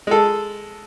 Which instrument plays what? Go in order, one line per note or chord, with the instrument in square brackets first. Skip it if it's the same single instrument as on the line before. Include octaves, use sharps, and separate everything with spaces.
[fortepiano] G#3 A4